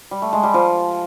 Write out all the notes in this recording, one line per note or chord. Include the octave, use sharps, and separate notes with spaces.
G3
A3
G#3
G3
F3